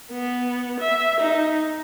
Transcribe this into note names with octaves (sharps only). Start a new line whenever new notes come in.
B3
E5
D#4